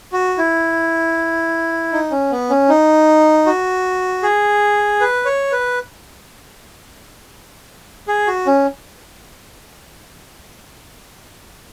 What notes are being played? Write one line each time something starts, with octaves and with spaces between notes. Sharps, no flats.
F#4
E4
D#4
C#4
B3
C#4
D#4
F#4
G#4
B4
C#5
B4
G#4
F#4
C#4